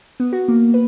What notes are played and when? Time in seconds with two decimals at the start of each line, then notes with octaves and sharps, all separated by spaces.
0.20 B3
0.33 F#4
0.48 A#3
0.74 B4